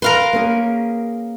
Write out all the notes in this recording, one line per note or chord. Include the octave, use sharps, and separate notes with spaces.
A#4 B4 F5 C6
A#3 C#4 G#4